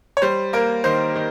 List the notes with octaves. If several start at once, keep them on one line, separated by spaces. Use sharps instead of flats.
C#5
G3 C5
A#3 A#4
D#3 C5
D#3